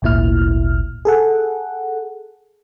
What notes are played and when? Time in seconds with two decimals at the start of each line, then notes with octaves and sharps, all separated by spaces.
0.02 G#1 D2 A#2 E4 F6
1.05 G#4 A4 F#5